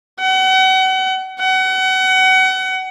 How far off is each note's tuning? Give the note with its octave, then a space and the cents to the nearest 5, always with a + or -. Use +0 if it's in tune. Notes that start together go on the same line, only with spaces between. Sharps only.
F#5 +35
F#5 +30